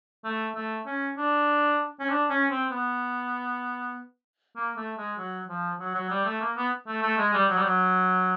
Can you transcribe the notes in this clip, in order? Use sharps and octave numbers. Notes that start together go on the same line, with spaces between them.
A3
A3
C#4
D4
C#4
D4
C#4
C4
B3
A#3
A3
G#3
F#3
F3
F#3
F#3
G3
A3
A#3
B3
A3
A3
G#3
G3
F#3
G3
F#3